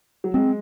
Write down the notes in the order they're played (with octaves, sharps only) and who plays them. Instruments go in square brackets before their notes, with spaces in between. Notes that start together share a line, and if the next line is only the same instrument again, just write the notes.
[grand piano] F#3
[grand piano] G#3 [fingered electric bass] C4